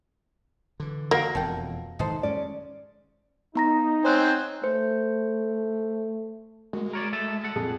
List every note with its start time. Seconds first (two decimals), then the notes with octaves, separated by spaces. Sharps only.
0.80 D3 E3
1.11 A#3 F#4
1.35 E1 F2 A4 G5
1.99 G#2 D#3 D#4 A4 C5
2.23 G#3 C#4 D5
3.55 B3 D#4 A#5 A#6
4.05 C4 C5 C#5 G#5 F#6
4.64 A3 C5
6.73 G#3 A#3 F#4
6.93 A#4 C#5 D5
7.13 A3 A4 A5
7.44 A4 F#5
7.56 F2 A#2 G#4 A5